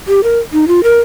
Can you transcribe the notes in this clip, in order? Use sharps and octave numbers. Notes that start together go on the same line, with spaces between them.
G4
A#4
D#4
F4
A#4